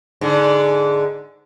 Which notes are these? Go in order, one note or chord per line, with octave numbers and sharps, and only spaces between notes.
G#2 D3